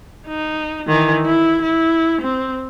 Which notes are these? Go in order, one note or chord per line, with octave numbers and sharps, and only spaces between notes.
D#4
D#3 E3
E4
E4
C4